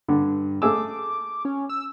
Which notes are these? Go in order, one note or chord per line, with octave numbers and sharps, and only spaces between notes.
G2 D3
A3 G#4 D6 E6
C#4
E6